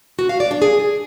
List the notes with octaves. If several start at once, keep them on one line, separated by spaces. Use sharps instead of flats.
F#4
F5
D5
D4
G#4